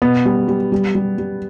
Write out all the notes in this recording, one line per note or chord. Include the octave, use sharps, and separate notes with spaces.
B2 B3
G3
G3
G3
G3
G3